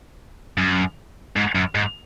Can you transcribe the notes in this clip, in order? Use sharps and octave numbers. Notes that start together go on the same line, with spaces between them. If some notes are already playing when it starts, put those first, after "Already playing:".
F#2
G#2
F#2
G#2